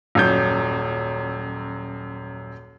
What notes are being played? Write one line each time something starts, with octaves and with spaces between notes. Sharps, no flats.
D#1 F#2 G6